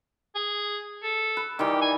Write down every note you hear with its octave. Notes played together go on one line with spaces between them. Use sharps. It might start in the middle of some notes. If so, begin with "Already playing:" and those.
G#4
A4
B4
D#3 E3 G3 G4
G#5